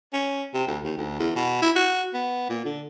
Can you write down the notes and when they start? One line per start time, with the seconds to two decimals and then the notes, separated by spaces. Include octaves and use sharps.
0.13 C#4
0.54 C3
0.67 D2
0.84 D#2
0.98 D2
1.19 E2
1.36 B2
1.62 E4
1.76 F#4
2.14 B3
2.49 A#2
2.65 D3